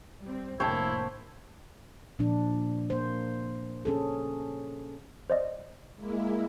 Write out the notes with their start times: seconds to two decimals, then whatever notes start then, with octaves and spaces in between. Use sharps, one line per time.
0.21 G3 C4
0.60 F1 A2 A#3 E4 C5 C#5 G5 A5
2.19 A#2 F3 D4
2.90 A#3 C5
3.85 C#4 G#4 A4
5.30 C5 D5 D#5
5.96 G#3 A#3 E4